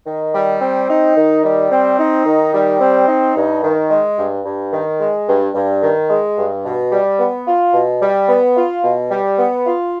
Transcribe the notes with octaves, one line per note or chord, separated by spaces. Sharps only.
D#3
G3
C4
D#4
D#3
G3
C4
D#4
D#3
G3
C4
D#4
G2
D#3
G#3
G2
G2
D#3
G#3
G2
G2
D#3
G#3
G2
B2
G3
B3
F4
B2
G3
B3
F4
B2
G3
B3
F4